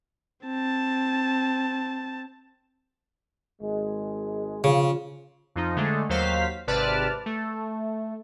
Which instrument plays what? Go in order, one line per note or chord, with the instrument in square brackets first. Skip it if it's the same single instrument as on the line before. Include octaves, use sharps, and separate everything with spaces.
[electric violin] C4 A5
[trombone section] G#1 G#3
[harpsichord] C#3 [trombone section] F3 F4
[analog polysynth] F2 F3 D#4
D3 G#3 A3
D#2 F#3 C5 F5 B6
G#1 C3 B4 D5 A5 F6
A3